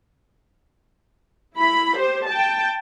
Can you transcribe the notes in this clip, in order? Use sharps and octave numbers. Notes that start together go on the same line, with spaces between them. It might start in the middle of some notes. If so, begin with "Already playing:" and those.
E4 B5
G4 C5
G5 A5